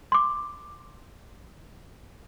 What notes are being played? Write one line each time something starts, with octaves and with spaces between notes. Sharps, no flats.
C6 D6